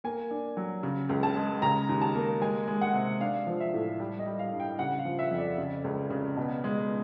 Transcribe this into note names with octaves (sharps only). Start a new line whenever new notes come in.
A#3 G#5
D4
F#3
C#3
C#2
A5
G#3
C#3 A#5
D#2
A5
A#3
G#3 G#5
G#3
F#5
C3
D4 F5
F3
E5
A2
G3
D#5
G3
F5
G2
G5
C#3 F#5
F5
F3
E5
F2
D5
C#3
C#2
C#3
B2
G#3